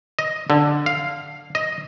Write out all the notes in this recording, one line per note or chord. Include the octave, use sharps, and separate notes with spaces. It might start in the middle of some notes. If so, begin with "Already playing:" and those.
D#5
D3
F5
D#5